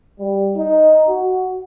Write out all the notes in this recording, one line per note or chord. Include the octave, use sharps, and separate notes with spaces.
G3
D#4
F#4